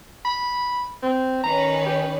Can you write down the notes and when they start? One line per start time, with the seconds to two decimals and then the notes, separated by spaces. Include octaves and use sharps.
0.25 B5
1.03 C4
1.44 D#3 C#4 B4 A#5
1.86 G4